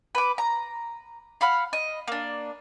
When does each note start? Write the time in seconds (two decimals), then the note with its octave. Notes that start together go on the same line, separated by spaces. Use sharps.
0.15 B4 D6
0.38 A#5
1.41 F5 F#5 B5 F6
1.73 D#5
2.08 A#3 D4